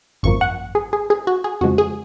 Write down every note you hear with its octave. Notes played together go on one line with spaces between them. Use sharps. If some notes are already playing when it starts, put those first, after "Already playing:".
G#1 F#2 F3 A#3 C#6
F#5
G#4
G#4
G#4
F#4
G#4
F2 C#3 F3 G#3 F#4
G#4